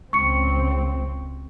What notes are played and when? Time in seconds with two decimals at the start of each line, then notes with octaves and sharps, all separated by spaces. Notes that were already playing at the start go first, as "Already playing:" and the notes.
0.13 C#2 C4 C#6 C#7